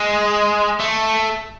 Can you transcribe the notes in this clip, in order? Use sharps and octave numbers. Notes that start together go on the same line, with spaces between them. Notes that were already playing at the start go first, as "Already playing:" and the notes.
Already playing: G#3
A3